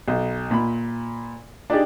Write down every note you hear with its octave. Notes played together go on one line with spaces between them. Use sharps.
B1
A#2 B5
D4 D#4 G4 G#4 D5